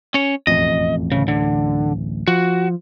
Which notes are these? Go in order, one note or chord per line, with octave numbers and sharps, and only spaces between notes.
C#4 C#5
E1 A1 F2 D#5
D1 A1 C#3
D3
F3 F#4